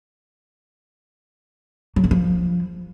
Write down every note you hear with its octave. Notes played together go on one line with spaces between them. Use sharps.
F#3
D3
F3